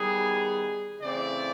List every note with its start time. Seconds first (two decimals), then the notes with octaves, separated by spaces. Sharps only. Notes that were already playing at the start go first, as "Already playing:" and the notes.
Already playing: D#3 G3 B3 G#4
1.01 C#3 E3 A3 C4 D5